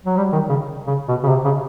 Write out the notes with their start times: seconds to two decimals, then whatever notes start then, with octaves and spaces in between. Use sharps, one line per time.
0.05 F#3
0.17 G3
0.33 D#3
0.49 C#3
0.87 C#3
1.08 B2
1.24 C#3
1.29 C3
1.45 C#3